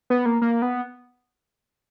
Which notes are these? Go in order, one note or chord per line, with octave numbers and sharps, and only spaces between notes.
B3
A#3
A#3
B3